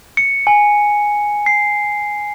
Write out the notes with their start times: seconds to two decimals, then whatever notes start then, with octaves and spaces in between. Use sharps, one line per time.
0.17 C#7
0.47 G#5
1.46 C7